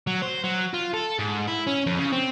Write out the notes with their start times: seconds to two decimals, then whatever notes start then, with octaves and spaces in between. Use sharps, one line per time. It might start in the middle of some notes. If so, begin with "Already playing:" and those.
0.07 F#3
0.22 C5
0.44 F#3
0.73 F4
0.94 A4
1.19 G#2
1.47 E4
1.67 C#4
1.87 F2
1.99 C#3
2.13 C4